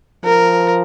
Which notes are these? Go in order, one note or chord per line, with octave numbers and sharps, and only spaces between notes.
F3 A#4